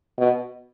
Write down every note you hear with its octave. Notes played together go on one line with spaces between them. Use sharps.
B2